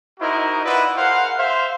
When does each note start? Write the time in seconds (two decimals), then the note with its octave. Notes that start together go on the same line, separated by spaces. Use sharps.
0.20 D#4 E4 F#4 A#4 C5 D#5
0.65 E4 F4 B4 D5 D#5 F#5
0.97 G#4 A#4 C5 F5 F#5
1.37 C5 E5 F5